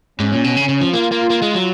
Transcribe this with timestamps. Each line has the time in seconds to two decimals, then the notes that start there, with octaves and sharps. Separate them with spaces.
0.20 G#2 C#4
0.32 A#2
0.44 B2
0.57 C#3
0.69 C#3
0.81 F3
0.93 A#3 F4
1.12 A#3
1.30 A#3
1.42 G#3
1.54 F#3